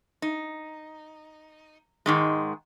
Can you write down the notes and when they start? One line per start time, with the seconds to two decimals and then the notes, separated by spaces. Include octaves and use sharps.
0.22 D#4
2.06 G#2 D#3 G#3